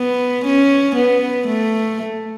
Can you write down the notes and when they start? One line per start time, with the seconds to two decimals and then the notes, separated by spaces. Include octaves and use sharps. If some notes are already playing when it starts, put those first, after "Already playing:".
Already playing: B3
0.45 C#4
0.96 B3
1.47 A3